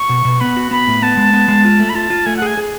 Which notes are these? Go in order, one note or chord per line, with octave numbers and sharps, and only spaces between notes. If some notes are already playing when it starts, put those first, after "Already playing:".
Already playing: C#6
B2
B2
B3 B5
F#4
B3 B5
A2
B3 A5
G#3
B3
G#3
F4
A3
B5
F4 A5
F4
A3 G#5
F#5
G#4 G#5
G#4